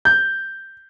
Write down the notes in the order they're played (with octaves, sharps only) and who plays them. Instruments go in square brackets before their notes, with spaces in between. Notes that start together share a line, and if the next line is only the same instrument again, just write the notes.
[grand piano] G6